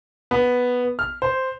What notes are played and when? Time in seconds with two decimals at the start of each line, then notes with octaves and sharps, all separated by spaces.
0.31 B3
0.99 F6
1.22 C5